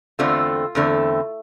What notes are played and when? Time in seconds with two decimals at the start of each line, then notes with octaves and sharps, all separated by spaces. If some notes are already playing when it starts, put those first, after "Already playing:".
0.19 E2 D3 A3 C4 F4
0.75 E2 D3 A3 C4